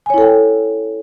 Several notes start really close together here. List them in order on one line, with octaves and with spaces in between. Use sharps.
G#5 C#5 E4 A4 G5